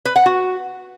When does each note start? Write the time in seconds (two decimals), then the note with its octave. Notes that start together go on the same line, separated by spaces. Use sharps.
0.05 B4
0.16 F#5
0.26 F#4